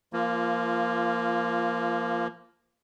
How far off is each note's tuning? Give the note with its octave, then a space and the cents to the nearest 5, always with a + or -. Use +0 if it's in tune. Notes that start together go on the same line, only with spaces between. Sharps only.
F3 -25 A#3 +0 F4 -10